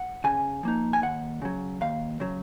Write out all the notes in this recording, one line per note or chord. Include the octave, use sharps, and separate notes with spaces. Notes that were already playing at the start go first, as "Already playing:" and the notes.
Already playing: F#5
C#3 G#5
F3 A#3 D#4
G#5
D#2 F#5
C#3 F#3
D#2 F5
C#3 F#3